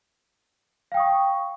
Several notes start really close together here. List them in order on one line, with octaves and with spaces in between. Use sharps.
F5 G5 D#6 C#6